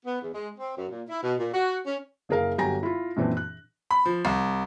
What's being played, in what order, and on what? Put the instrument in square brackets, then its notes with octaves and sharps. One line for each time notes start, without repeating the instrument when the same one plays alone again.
[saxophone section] B3
E2
G#3
C4
F#2
A#2
E4
B2
A#2
F#4
C#4
[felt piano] F#1 G#4 A#4 F5
G1 F#3 G4 G#5 A#5 A#6
E4 F4
F#2 A#2 E3 C4 D4
F#6
[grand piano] B5
F3
C2